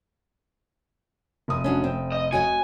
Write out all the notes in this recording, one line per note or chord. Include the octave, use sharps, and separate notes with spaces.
F1 D#6
C#4 D4 F#4
C4
D#5
F#4 C#5 D#5 G#5